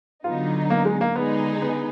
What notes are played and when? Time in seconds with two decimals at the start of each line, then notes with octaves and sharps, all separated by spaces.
0.24 D3 F#3 B3 D#4 F4
0.70 A#3
0.85 G#3
1.01 A#3
1.16 D3 G#3 B3 D#4 G#4
1.62 B3